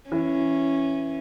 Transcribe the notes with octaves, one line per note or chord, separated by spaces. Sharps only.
E3 C#4